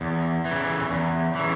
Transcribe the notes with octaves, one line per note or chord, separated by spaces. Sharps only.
E2
E3
C#3
E2
C#3 E3